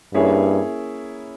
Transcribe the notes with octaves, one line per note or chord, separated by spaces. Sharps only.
G2 A#3 C#4 E4 G#4 C#5